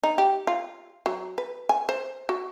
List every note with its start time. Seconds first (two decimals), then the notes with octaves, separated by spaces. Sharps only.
0.03 D#4
0.18 G4
0.47 F4
1.06 F#3
1.38 B4
1.69 G#5
1.89 C5
2.29 F#4